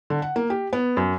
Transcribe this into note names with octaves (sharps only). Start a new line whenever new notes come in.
D3
F#5
A#3
G4
B3
F#2